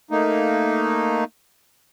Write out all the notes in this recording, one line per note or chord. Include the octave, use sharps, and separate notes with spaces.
A3 A#3 D#4